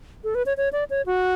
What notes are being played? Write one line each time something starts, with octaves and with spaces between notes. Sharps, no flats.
A4
B4
C#5
C#5
D5
C#5
F#4